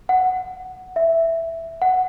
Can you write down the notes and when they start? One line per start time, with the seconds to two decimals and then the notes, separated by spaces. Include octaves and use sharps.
0.09 F#5
0.96 E5
1.82 F#5